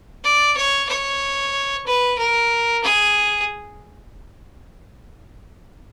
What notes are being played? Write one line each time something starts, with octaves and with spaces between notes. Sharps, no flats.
D5
C#5
C#5
B4
A#4
G#4